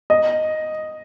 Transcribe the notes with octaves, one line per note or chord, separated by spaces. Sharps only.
D#5